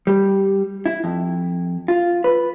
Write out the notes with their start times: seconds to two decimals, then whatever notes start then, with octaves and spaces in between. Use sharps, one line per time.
0.07 G3
0.86 E4
1.04 F2
1.88 F4
2.24 B4